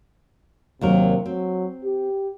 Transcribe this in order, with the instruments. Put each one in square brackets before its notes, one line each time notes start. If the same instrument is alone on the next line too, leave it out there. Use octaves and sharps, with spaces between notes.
[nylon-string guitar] D#2 F#3 A#4 [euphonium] C3
[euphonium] F#3 [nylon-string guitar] C4
[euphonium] G4